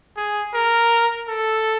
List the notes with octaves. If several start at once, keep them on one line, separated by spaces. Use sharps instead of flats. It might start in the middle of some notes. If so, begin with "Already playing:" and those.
G#4
A#4
A4